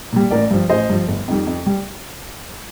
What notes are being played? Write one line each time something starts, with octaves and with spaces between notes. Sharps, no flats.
A#2 G3
A1 A#4 D5
G2 F3
A1 C5 D#5
G2 F3
G1
F2 D#3 G3
F2
G3